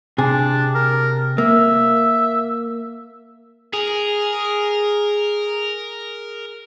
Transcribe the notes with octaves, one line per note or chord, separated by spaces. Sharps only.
C3 D4 G#4
A#4
A#3 E5
G#4 A#4